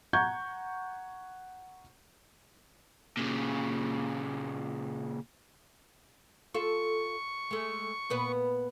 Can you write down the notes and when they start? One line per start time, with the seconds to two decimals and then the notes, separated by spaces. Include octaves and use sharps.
0.13 F#5 A#5 C#6 G6 G#6
3.17 A#2 C#3
6.54 F4 A4 C#6
7.51 G#3 A3
8.10 A#2 B3 B4